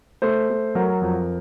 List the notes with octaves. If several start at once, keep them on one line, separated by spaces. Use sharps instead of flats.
A3 C5
A3
F#3 A#4
F2